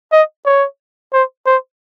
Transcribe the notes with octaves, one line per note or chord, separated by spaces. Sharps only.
D#5
C#5
C5
C5